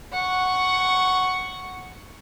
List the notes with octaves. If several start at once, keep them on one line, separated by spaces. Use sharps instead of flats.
F#5 C#6